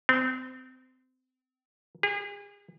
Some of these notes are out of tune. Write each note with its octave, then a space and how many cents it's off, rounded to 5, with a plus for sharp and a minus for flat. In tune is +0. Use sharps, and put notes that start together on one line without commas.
C4 -30
G#4 -40